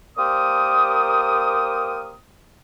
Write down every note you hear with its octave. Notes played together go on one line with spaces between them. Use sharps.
A#3 G4 A#4 C5 D5 D#6